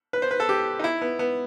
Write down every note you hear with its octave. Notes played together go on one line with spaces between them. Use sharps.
B4
C5
B4
A4
G4
D#4
E4
B3
B3